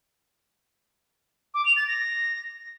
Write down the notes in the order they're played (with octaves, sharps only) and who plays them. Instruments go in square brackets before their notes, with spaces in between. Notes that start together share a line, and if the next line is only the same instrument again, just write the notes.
[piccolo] D6
F7
A6
A#6